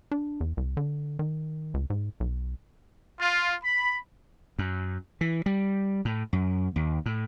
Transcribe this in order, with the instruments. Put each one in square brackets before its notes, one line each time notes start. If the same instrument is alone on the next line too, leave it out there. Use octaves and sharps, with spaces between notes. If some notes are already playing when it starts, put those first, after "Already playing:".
[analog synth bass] D4
E2
C2
D3
D#3
C#2
G#2
B1
[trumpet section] F4
B5
[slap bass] F#2
E3
G3
A2
F#2
D#2
A2